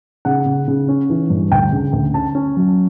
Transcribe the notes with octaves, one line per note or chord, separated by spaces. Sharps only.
C#3 F#5
C#3
C#3
C#4
E3
G2
D2 G5
C#3
D2
C#4 A5
C#4
F#3